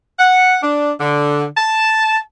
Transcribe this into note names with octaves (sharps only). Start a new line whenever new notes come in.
F#5
D4
D3
A5